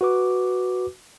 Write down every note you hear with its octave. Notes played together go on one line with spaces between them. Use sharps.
F#4 B4 D6